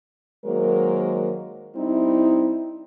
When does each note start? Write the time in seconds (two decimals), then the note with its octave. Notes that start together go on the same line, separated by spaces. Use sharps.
0.45 D#3 F#3 G#3 A#3 A#4 C5
1.76 G3 C4 D#4 E4